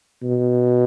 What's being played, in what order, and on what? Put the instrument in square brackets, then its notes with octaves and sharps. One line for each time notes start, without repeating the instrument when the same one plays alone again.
[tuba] B2